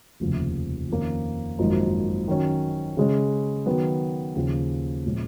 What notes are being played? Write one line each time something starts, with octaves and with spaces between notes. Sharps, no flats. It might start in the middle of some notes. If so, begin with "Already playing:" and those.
F1 D#2 C#3 F3
F2 D#3 A#3 C#4
G#1 F#2 F3 A#3 D#4
D#3 F#3 C#4
C#3 G#3 C#4
D#3 F#3 B3
D#2 C#3 F3
A#2 F3 G#3 C#4